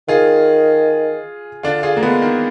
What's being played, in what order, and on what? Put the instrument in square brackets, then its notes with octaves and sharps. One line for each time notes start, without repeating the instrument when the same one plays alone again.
[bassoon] D#3 [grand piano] F4 G#4
[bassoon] D3 [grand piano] D4 F4
[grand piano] F4 G#4
A#3
G#3 B3
D#3